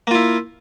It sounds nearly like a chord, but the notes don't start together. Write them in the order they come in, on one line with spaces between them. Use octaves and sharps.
A#3 F4 E4